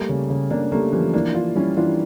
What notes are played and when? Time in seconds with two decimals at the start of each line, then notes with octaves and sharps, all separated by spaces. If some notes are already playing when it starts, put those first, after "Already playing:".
Already playing: G3 A3 A#3
0.09 C#3
0.30 C#3
0.51 C#3 A#3 D4
0.72 G3 A3 A#3
0.92 E3 F3 G3
1.14 E3 A#3 D4
1.34 E3 D4 F4
1.56 G3 C#4 E4
1.77 E3 D4 F4